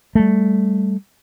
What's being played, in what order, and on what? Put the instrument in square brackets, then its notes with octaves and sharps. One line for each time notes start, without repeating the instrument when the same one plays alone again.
[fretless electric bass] G3 A3